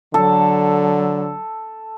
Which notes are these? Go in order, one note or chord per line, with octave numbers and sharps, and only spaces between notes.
D3 F#3 A4